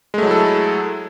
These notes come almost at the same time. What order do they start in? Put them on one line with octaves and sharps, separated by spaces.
G#3 A3 F#3 E4 A4